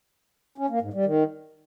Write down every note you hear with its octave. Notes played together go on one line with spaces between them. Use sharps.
C#4
A#3
G#2
G3
D#3